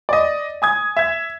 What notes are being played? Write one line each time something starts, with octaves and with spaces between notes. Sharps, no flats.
D5 D#5
G#5 D#6 G#6
E5 G#6